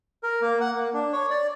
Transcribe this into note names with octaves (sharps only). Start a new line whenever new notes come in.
A#4
A#3
F#5
A#3
D4
C#5
D5